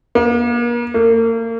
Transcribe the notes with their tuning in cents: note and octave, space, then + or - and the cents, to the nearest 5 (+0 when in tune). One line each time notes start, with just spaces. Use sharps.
A#3 +40
A#3 -35